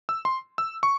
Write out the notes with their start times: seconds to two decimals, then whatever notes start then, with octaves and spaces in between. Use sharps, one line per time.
0.09 E6
0.25 C6
0.58 E6
0.83 C#6